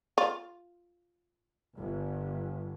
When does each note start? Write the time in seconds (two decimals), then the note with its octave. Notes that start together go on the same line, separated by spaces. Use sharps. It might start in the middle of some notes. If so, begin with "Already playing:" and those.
0.18 F4
1.77 G1